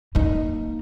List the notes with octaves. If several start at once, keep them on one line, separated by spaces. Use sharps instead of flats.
A#3 D#4